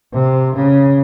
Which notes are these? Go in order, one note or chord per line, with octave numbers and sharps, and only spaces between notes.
C3
C#3